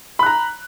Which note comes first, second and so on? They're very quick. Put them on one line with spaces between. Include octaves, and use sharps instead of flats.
B5 F#6 A#5